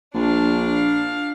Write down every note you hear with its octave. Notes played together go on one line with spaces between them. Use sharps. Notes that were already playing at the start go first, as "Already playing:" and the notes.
A#1 D4 F5